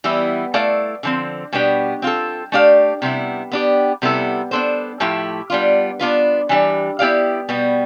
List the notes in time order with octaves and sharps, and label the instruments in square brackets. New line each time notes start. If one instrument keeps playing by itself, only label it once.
[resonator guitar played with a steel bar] E3 G3 B3 E4
A3 E4 A4 D5 F5
D3 F3 C4
B2 G3 B3 D4 G4
C4 F4 A4
A3 D4 G4 D5 F5
C3 G3 B3 E4
B3 D4 G4
C3 G3 B3 E4 A4
B3 D4 A4 C5
A2 F3 A3 E4 G4
G3 B3 D4 F4
B3 D4 F4 B4
E3 G3 D4 G4
B3 E4 G4 D5 F5
B2 G3 B3